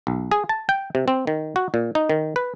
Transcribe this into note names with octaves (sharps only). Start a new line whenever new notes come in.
B1
G#4
A5
G5
C3
C4
D#3
F#4
A#2
D#4
D#3
B4